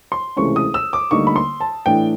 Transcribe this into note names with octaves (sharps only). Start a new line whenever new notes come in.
C6
C#2 C3 E3 A3 C#4 C#6
D#6
E6
D6
D2 D3 G3 A#3 D#4 C#6
B5
C6
A5
A2 E3 A3 D4 G5